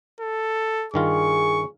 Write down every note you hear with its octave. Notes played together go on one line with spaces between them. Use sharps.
A4
G2 D#3 F4 G#4 C#6